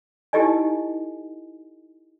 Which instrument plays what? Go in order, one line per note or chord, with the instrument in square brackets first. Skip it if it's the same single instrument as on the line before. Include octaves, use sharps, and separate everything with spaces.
[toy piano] D#4 E4 G4 A4 D#5 G#5